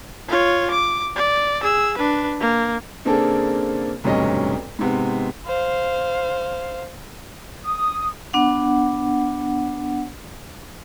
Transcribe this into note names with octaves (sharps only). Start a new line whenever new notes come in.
F4 C#5
D6
D5
G#4 E6
D4 B4
A#3
C#3 A#3 C4 D4 G#4 A4
E1 D2 G2 C3 C#4 D#5
G#2 C3 B3
C5 F5
D#6
B3 D4 F#5